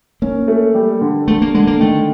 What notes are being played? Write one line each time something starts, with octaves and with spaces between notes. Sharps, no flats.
A#3 C#4
A3
G3
D3
D3 A3
A#3
D3 G#3
A#3
D#3 A3